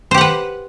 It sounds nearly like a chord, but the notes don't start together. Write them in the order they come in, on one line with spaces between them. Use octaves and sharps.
C5 G4 F#5 B4